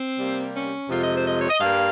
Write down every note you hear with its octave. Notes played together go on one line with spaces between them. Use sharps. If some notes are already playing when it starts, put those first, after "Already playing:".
Already playing: C4
C3 G3 A#3
C#4
F2 C3 F3 G#3 F4
D#5
C5
D#5
C#5
D#5
G2 G3 A#3 F5